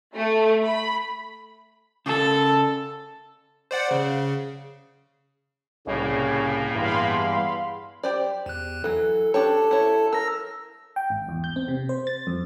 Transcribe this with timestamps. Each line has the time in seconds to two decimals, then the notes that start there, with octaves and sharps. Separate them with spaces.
0.16 A3
0.64 B5
2.06 C#3 A4 A5
3.71 C5 D5 F#5
3.91 C#3
5.87 C2 A2 C#3 A#3
6.74 E2 G2 F5 B5 C6
8.03 G4 C5 D5
8.46 E2 F#6
8.84 E3 F#3 A4
9.34 D4 G4 A4 C#5 A5
9.71 E4 C#5
10.13 A#4 E6 A#6
10.96 G5
11.10 G#1
11.28 E2
11.44 G6
11.56 C4
11.68 C3
11.89 C5
12.07 A6
12.27 F2